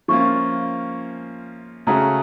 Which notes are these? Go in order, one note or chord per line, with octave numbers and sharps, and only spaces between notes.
F3 A#3 C#4 F4 C#6
C#3 A3 C#4 F#4 A#5